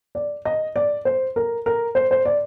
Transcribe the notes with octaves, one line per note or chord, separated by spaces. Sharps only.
D5
D#5
D5
C5
A#4
A#4
C5
C5
D5